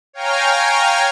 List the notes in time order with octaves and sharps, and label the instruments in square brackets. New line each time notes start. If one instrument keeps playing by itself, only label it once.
[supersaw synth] C#5 F5 G5 G#5 A#5 F6